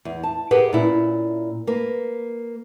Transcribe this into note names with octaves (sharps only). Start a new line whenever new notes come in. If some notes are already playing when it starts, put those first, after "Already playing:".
E2
A5
G4 G#4 A#4 B4 F#5
A#2 C#4 E4
A#3 B4